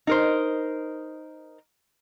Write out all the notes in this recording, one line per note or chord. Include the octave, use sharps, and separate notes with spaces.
D#4 A#4 C5